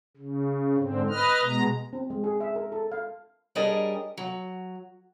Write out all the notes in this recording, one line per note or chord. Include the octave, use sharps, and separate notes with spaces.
C#3
G#2 D3 C4
B4 D#5 F6
B2 G#3 A#5
C4
G#3
G#4
E5
A#4
A4
F5
G3 D4 G#4 A#4 C#5 D#5
F#3